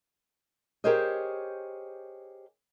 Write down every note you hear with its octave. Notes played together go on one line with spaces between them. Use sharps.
G4 G#4 A#4 C5 C#5 D#5